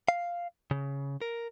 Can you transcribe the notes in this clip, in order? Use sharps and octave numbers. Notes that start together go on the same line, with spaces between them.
F5
C#3
A#4